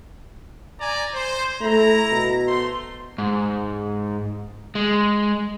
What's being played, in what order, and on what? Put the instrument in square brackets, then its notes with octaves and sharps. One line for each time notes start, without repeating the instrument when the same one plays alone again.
[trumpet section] D5 G#5 A#5
C5
[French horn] A3 [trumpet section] E4 A#5
[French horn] B2
[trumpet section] A3 C5 C6
[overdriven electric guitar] G#2
G#3